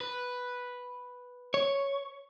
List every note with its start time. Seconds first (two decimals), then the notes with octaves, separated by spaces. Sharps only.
0.01 B4
1.54 C#5